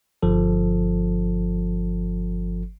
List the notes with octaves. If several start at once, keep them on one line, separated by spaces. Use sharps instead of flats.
G1 F3 A4